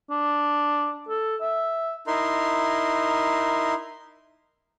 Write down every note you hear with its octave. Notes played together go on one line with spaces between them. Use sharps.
D4
A4
E5
D#4 E4 A#4 C6